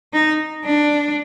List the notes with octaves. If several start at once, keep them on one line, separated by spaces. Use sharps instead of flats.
D#4
D4